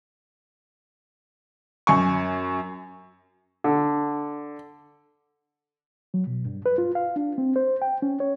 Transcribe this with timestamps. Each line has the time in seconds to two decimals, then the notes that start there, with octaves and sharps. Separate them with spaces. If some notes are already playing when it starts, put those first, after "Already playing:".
1.87 F#2 G#5 C#6
3.64 D3
6.14 F#3
6.27 B2
6.45 G2
6.66 B4
6.78 F4
6.95 F5
7.16 D4
7.38 C4
7.56 C5
7.82 G5
8.02 C#4
8.20 C#5